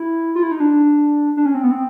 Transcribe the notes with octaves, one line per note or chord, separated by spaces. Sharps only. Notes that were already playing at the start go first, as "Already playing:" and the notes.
Already playing: E4
F4
E4
D#4
D4
D4
C#4
C4
B3
C4